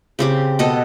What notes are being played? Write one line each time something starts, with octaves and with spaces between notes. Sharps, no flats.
C#3 C4 G4
B2 A4 D#5